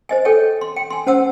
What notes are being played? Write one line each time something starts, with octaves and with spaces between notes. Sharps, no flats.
C5 D#5 G#5
A4 C#5 G5 G#5
C6
G5
G#5 C6
C#4 C5 F#5 A5 E6